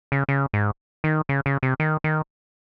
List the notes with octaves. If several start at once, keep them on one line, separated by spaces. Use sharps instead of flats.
C#3
C#3
G#2
D#3
C#3
C#3
C3
D#3
D#3